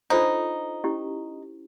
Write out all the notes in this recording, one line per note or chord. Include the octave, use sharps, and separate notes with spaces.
D4 D#4 F4 A4 C5
C#4 E4 G4